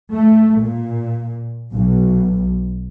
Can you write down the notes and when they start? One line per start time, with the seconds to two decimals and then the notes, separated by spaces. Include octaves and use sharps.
0.13 A3
0.62 A#2
1.73 B1